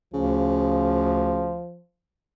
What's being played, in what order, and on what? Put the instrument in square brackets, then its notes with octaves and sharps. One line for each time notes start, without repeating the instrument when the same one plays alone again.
[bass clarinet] D2 [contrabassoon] C#3 [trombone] F3